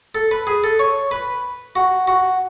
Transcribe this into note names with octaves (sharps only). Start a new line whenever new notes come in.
A4
B4
G#4
A4
C#5
B4
F#4
F#4